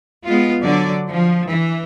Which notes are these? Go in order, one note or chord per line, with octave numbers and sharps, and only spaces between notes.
G#3 B3 F4
D3 F#3 D5
F3
E3